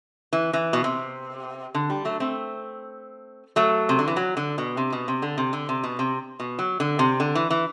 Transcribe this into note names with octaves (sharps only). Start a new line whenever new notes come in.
E3
E3
B2
C3
D3
G3
F#3 A3
A3 C4
F#3 A3
C3
D3
E3
F#3
D3
B2
C3
B2
C3
D3
C3
D3
C3
B2
C3
B2
F#3
D3
C3
D3
E3
E3